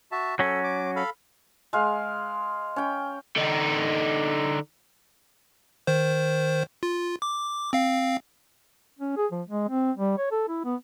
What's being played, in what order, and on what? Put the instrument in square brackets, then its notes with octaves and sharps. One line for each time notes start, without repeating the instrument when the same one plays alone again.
[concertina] F#4 E5 A5
[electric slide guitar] F#3 C#4 [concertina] A4
[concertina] D6
A4 F5 B5
[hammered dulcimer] G#3 F5
C#4 G5
[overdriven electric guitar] D3 D#4
[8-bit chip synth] D#3 C5
F4
D6
C4 F5
[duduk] C#4
G#4
F3
G#3
C4
G3
C#5
A4
E4
B3